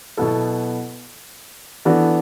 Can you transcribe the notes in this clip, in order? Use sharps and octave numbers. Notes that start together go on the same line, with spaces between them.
B2 F#3 B3 E4 A4
E3 B3 D4 F#4 A4